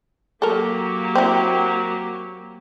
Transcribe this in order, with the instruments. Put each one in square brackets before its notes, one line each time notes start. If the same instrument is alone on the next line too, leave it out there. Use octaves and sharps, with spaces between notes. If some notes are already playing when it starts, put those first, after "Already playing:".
[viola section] F#3 A#3 G4 [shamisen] A4 A#4
[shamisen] C4 E4